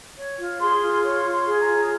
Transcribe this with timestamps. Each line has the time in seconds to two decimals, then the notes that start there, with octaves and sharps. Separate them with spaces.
0.17 C#5
0.38 F4
0.60 G#4 C6
0.81 F4
1.03 C#5 C6
1.25 F4
1.32 C6
1.46 G#4
1.61 A#5
1.67 F4